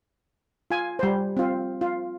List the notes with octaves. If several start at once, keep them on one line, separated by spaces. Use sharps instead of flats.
F4 G#5
G3 C5
C4 F4
F4